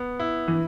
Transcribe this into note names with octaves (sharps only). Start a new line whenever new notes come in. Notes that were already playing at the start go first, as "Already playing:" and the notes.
Already playing: B3
E4
E3